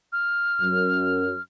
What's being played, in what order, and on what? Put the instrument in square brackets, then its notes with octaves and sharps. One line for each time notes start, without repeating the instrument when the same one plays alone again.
[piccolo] F6
[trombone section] F#2